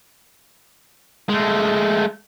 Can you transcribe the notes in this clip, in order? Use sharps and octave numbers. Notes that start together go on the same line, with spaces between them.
G#3 A3